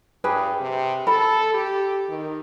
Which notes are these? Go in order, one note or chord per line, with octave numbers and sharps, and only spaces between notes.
G2 G4 G#4 B4
C3
A4 B5
G4
D#3